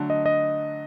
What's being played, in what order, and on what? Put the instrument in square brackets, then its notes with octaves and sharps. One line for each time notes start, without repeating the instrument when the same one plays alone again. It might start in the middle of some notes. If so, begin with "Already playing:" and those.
Already playing: [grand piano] D3 F#3 A3 D4
[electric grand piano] D#5
D#5